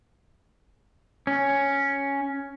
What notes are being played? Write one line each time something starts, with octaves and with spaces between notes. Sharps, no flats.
C#4